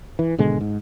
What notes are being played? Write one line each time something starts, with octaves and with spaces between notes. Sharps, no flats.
E3
G#1 B2 D3 G#3
G#2